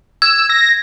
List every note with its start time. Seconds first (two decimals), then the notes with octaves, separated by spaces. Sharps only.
0.22 E6 G#6
0.50 A#6